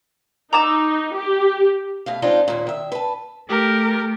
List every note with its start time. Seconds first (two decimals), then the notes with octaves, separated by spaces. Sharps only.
0.53 D#4 A#5 D6 E6
1.15 G4
2.06 B2 A3 F5
2.22 G#3 C4 D4 D#4 F4
2.48 D#2 A#2
2.67 D#3 E5
2.92 B4 A5
3.49 A3 G4 A4 A#4